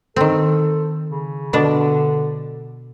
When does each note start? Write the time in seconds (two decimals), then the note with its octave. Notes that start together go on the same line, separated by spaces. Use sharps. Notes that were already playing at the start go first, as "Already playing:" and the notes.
0.16 D#3 C4 A4
1.09 C#3
1.53 B2 D3 D4